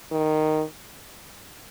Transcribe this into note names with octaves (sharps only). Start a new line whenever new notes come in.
D#3